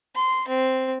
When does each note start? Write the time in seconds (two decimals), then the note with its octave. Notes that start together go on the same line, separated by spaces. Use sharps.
0.15 C6
0.48 C4